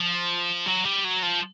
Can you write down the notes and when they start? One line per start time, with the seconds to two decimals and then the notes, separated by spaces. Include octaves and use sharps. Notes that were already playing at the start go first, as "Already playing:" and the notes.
Already playing: F3
0.66 F#3
0.85 G3
1.04 F#3
1.23 F3